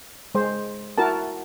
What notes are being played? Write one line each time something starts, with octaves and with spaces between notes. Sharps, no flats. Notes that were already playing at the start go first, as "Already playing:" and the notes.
G#3 C5
E4 F#4 A#4 A5